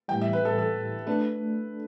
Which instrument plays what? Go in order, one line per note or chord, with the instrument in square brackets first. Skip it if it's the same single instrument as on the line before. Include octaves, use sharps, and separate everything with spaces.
[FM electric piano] A2 E3 G3 [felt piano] G5
[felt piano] E5
B4
A4
A4
[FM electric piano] A3 D4 A4 [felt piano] B4